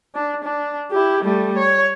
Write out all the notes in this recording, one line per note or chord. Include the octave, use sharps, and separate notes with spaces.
D4
D4
E4 G4
G3 A3
C#5